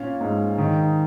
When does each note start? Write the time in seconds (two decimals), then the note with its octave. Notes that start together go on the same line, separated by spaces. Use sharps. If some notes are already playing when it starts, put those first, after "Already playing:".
Already playing: A#2 C#4 F5
0.21 G#2
0.58 D#3